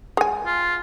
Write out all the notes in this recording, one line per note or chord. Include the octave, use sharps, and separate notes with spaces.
G#3 G#5
F4